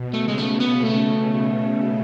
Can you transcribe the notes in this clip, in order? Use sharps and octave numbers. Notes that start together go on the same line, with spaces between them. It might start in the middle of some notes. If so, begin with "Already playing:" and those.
Already playing: B2
A3
C#3
G#3
A3
C#3
B3
A3